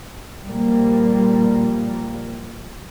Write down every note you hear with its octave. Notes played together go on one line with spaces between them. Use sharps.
A#2 F3 G3 A#3